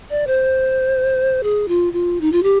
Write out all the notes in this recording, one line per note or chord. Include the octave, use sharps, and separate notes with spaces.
D5
C5
G#4
F4
F4
D#4
F4
G4